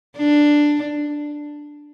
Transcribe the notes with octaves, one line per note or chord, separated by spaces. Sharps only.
D4